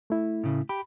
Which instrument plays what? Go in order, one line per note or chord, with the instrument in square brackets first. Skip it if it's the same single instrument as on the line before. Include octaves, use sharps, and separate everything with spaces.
[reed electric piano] A3 E4
[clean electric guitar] A2 C#3
[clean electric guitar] G4 [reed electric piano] B5